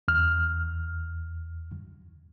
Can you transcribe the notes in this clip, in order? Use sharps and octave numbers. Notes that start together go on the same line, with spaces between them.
E2 F6